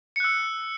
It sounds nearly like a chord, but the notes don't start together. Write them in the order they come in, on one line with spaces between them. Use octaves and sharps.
C#7 F#6 E6